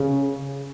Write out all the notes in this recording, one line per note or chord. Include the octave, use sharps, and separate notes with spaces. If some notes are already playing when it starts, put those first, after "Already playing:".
Already playing: C#3